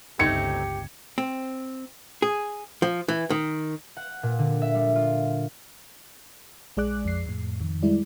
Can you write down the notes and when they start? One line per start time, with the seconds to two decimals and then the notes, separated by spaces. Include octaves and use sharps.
0.19 G1 C#2 A3 C4 D#4 G4 G#6 C#7
1.18 C4
2.22 G#4
2.82 F3
3.08 E3
3.30 D#3
3.97 F#5
4.23 A#2
4.39 D3
4.62 E5
4.75 G3
4.95 F4
6.77 A#1 G#3 G#4 D5 D6 F#6
7.05 F2 C7
7.26 F2 A2
7.61 F2 D#3
7.83 G3 G#3 E4 D5